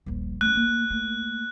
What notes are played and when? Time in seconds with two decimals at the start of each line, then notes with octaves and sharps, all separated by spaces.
0.06 D#1 A#1
0.41 A3 C#4 F#6
0.56 A#3
0.90 A3 A#3